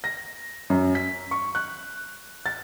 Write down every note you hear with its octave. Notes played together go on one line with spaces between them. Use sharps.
A#6
F#2
B6
C#6
F#6
A6